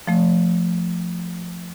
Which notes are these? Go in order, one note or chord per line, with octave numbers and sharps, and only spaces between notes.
F3 A3